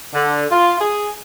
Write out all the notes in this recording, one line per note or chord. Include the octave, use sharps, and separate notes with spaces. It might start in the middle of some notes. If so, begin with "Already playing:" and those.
D3
F4
G#4